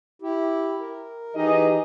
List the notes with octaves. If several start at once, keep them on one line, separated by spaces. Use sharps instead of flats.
E4 G4
A#4
E3 D#4 G4 G#4 D#5